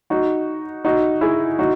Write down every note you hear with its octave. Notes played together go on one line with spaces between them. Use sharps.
D#4 F#4
D#4 F#4
E4 G#4
D#4 F#4